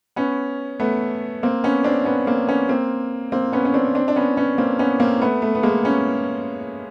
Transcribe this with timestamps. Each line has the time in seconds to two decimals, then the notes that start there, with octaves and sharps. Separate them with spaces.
0.16 B3 C#4
0.80 A3 B3
1.43 A#3 C4
1.64 B3 C#4
1.84 C4 D4
2.05 B3 C#4
2.27 A#3 C4
2.47 B3 C#4
2.69 A#3 C4
3.32 A#3 C4
3.53 B3 C#4
3.65 C#4
3.74 C4 D4
3.95 C4 D4
4.08 D4
4.16 B3 C#4
4.37 B3 C#4
4.58 A#3 C4
4.79 B3 C#4
5.00 A#3 C4
5.21 A3 B3
5.42 A3 B3
5.55 B3
5.63 G#3 A#3
5.84 B3 C#4